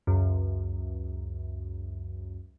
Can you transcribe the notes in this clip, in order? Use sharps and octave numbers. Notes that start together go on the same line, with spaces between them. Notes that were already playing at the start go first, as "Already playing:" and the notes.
C#2 F#2